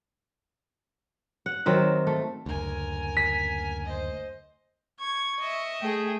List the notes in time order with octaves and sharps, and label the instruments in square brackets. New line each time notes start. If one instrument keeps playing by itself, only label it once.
[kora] F#5
D#3 F#3 C4 E5
A3
[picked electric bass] F#1 D2 [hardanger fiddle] A#4 G#5
[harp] B6
[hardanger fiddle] C5 D#5
[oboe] C#6 [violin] G#6
[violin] D#5 E5
[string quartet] A3 [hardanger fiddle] G#4 G5